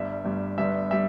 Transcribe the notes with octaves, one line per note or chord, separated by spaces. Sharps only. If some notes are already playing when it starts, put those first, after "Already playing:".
Already playing: G1 G2 G3 E5
G1 G2 G3
G1 G2 G3 B3 E5
G3 E5